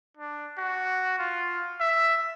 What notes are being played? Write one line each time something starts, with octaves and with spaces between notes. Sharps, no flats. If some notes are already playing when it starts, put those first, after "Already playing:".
D4
F#4
F4
E5